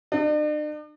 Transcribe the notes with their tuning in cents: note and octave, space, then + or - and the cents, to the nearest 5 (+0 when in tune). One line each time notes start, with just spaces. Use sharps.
D4 +45